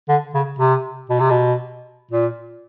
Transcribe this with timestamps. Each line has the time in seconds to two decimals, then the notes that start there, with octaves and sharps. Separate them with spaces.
0.08 D3
0.34 C#3
0.59 C3
1.10 B2
1.20 C3
1.30 B2
2.11 A#2